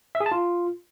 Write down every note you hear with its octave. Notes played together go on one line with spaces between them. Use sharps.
E5
G#4
A5
F4